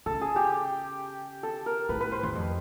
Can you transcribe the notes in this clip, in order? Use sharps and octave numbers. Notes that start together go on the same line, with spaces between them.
C#3 A4
G#4
G4
A4
A#4
A2 B4
B4
C5
E2 C5
F2